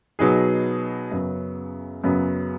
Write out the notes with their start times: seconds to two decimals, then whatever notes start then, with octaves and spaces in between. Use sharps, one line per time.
0.19 B2 F#3 B3 D#4 G#4
1.11 F#2 C#3 F#3 B3
2.04 F#2 C#3 F#3 B3